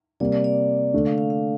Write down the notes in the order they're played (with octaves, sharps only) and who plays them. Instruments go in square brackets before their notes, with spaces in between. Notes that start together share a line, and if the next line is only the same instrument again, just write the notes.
[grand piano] C3 G3 A#3 [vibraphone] D5
[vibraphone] D5
D5
[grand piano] D3 A3 D4
[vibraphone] F5
F5
F5